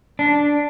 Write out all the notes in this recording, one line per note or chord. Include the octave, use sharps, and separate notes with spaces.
D4